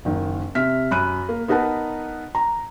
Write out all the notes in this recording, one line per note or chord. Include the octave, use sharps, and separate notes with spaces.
F#1 D#3
C3 E5 F6 B6
F#2 B5 F#6 D#7
A#3
B3 D#4 A#4 B4 F#5 A5
A#5